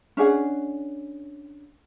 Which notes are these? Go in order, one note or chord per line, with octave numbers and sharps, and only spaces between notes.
C#4 D4 G#4 F#5